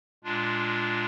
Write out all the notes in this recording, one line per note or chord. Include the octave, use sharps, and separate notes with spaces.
A#2 G#3 D4 F4